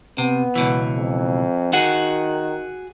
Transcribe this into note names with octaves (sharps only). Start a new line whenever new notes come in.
C3 B3
C#2 B2 E3
F2
D#3 F#4 G#4 F#5